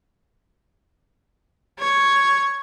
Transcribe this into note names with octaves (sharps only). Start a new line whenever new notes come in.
C#5